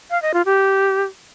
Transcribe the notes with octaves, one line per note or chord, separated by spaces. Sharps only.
F5
D#5
F4
G4